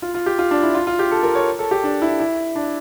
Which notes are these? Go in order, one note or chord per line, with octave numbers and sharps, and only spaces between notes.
F4
F4
G4
F4
D4
E4
F4
F4
G4
A4
A#4
C#5
A4
G4
D4
E4
E4
D4